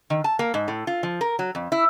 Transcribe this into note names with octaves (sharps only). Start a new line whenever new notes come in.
D#3
A5
A#3
G#2
A2
F4
F3
A#4
F#3
F2
E4